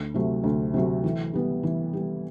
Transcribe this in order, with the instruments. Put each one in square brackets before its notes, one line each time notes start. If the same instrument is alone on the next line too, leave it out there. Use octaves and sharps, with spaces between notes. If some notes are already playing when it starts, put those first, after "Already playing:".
Already playing: [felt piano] D2
C3 F#3 A3
D2
C3 F#3 A3
E3
G3 B3
E3
G3 B3